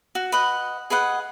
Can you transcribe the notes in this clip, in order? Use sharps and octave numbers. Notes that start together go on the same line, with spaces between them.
F#4
B4 D#5 F#5
G#4 B4 D#5 F#5